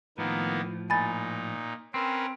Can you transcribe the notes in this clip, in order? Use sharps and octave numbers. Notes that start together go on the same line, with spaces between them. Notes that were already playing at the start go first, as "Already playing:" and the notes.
A2 D#3 F3 A#3 B3
A#2 D#4 G#5 B5 A6
C4 C#4 A#4 B4